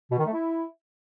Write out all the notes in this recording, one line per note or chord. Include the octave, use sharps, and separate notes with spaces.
B2
D#3
A3
E4